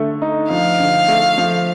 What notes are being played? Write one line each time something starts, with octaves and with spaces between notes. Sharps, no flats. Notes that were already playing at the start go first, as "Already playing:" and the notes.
Already playing: D3 A3
D#4
F3 F5
D3
A3
F3